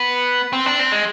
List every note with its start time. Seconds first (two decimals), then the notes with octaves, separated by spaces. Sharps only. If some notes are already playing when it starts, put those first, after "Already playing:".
Already playing: B3
0.53 C4
0.66 D4
0.79 C4
0.92 G#3